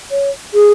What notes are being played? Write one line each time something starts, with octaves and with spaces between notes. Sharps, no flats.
C#5
G#4